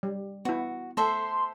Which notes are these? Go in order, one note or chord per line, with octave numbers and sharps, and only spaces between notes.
G3
B3 E4 F#4
A3 A4 C5 E5 C6